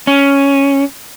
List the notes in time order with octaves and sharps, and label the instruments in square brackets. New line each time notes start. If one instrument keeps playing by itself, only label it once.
[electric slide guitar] C#4